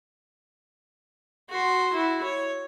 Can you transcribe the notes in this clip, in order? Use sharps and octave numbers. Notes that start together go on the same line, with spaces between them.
F#4 C6
E4 F#4
C#5